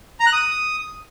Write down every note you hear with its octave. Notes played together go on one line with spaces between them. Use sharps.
A#5
F#6
D#6